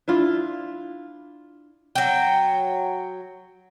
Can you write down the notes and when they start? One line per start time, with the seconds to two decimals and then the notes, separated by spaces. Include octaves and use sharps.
0.08 D4 E4 F4
1.95 F#3 G5